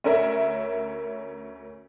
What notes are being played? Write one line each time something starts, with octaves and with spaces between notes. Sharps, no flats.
D2 C#4 A#4 E5